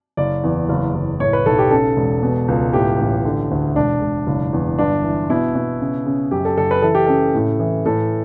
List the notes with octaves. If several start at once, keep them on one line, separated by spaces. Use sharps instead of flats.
F#1 D5
E2
F#1
F#1
A2 C#5
B4
B1 A4
G4
C#3 A4
E1
B2
C#2
A2 G4
A1
D3
D2
E1 D4
E1
F#1
E2
G1 D4
E3
B2 E4
B2
C#3
C#3
F#2 G4
A4
F#1 A4
B4
E3 A4
G4
C#3 A4
A2
E3
A2 A4